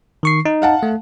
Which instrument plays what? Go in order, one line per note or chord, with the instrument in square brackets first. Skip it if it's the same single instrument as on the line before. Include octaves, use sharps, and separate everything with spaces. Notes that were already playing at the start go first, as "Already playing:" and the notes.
[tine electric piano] D#3 C#6 C7
D#4
[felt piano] F5 F#5 A5
[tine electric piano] A3